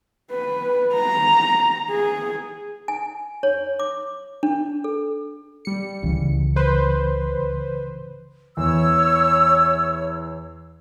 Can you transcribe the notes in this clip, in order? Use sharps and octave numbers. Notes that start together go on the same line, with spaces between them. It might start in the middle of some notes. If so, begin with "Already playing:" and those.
B4
A#5
G#4
G#5
C#5
D6
D4
A4
G3 C#7
C#2 C#3 E3
B4 C5
E2 C#5 E6